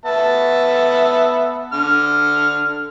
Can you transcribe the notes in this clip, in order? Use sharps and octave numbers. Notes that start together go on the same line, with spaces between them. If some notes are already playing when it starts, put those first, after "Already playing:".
B3 E5 A5
D3 F6